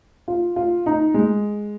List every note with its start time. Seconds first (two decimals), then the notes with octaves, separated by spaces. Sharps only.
0.28 F4
0.56 F4
0.86 D#4
1.14 G#3